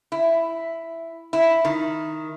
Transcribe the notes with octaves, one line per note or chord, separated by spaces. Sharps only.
E4
E4
D#3